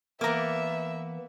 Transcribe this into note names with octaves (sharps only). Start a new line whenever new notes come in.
E3 A#3 B3 A#4 E5 D6